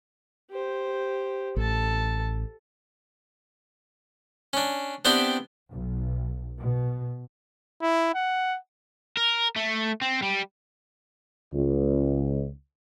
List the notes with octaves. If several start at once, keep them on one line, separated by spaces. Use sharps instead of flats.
G4 C5
A1 A4 A5
C#4 D4
B3 C4 D4 E4 G4 D5
B1
B2
E4
F#5
A#4
A3
C4
G3
C#2